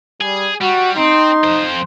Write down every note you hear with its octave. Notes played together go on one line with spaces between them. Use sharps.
G3 G#4
G3 F#4
C4 D#4 C6
F2 C5